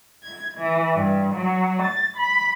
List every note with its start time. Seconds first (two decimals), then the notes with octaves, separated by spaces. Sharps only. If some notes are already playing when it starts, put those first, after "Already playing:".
0.23 G#6
0.58 E3
0.93 G2
1.34 F#3
1.82 A6
2.16 B5